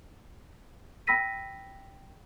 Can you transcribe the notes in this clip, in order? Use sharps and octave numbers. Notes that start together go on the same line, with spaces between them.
G5 B5 E6 A#6 B6 D#7